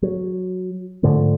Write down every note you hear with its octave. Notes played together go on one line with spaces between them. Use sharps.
F#3
G#2 D3 F3 A3